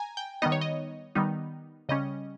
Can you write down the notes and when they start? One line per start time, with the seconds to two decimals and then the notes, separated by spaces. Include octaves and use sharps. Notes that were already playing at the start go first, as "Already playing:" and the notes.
Already playing: G#5 A#5
0.17 G5
0.42 D#3 G3 B3 D#4 D#5
0.52 C#5
0.61 D#5
1.15 D#3 G3 B3 D#4
1.89 C#3 G3 C#4 D#5